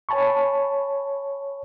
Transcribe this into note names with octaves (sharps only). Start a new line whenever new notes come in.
C#5 G#5 A5 B5 C#6